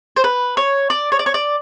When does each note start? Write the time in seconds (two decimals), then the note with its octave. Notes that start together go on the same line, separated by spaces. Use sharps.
0.16 C5
0.24 B4
0.57 C#5
0.90 D5
1.12 C#5
1.19 D5
1.26 C#5
1.34 D5